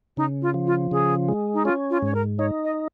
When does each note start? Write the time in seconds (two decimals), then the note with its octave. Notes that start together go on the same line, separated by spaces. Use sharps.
0.17 C#3 D#4
0.42 F4
0.54 F3
0.67 F4
0.91 C#3 G#4
1.29 G#3
1.54 D#4
1.65 C#4 F4
1.90 F4
2.02 G#2 C#5
2.14 A#4
2.38 D#4 C#5
2.64 D#5